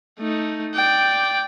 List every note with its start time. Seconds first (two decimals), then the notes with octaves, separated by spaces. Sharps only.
0.19 A3 D#4
0.74 D5 G5